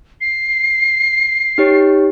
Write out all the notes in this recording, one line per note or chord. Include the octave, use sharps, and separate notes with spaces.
C7
D#4 G4 C#5